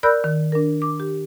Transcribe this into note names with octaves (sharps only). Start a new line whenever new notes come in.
A#4 D5 B5 E6 F#6 G6
D#3
D4 A#4
D6
G4